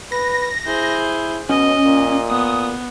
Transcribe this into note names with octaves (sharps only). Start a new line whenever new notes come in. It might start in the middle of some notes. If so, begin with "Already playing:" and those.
B4 A#6
E4 G#4 C5
B2 C#4 D#5
A#2
B3 D#6